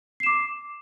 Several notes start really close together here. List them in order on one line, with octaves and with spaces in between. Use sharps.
C7 E7 D6